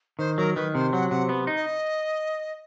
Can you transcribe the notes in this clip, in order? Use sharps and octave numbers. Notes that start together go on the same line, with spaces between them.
D#3 C5
F#3 A#4
D#3 B4
C3 C5
F#3 F#5
C3 F#5
B3
D#4
D#5